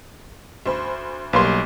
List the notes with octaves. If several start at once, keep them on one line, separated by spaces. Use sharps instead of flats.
D2 C5 B5
B1 G3 A#3 B4 C6